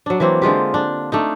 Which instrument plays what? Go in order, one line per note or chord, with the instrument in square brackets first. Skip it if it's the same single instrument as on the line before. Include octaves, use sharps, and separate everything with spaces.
[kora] F#3 D4
E3 F#3 A#3 C4
D3 G#3 F4 G4
D4
A3 D4 D#4